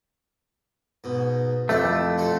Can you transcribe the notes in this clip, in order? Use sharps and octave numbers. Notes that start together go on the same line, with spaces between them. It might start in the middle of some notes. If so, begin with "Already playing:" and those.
G#2 B2
F2 A3 E4 G4 G5
F4 F#4 A4